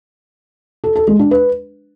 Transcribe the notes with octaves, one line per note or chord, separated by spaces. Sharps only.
A4
A4
G#3
D4
B4